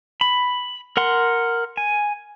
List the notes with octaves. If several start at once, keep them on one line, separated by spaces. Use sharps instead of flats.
B5
A#4 F#5 C6
G#5